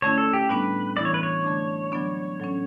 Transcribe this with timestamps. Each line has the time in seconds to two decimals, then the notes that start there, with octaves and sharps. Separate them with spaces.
0.02 D3 A3 C#4 E4 C#5
0.18 A4
0.33 G4
0.49 A2 G3 B3 D4 B4
0.97 E3 B3 E4 D5
1.05 C#5
1.14 B4
1.23 C#5
1.44 D3 A3 D4
1.92 D3 F#3 B3 D4
2.40 A2 F#3 C#4